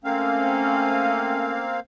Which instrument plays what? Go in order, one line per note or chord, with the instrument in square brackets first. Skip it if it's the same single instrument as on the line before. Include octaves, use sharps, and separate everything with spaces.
[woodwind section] A3 C#4 [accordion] A#3 C4 F5